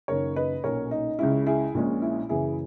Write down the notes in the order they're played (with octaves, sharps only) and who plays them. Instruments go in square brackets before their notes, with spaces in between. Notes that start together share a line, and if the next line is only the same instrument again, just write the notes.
[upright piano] F#1 F#2 D#3 A#4 C#5
B4 D#5
B1 A#2 A#3 C#4 A#4 C#5
D#4
C#2 C#3 G#3 C#4 E4
E4 G#4
A#1 A#2 G#3 C#4
E4
F#1 F#2 C#3 E3 E4 G#4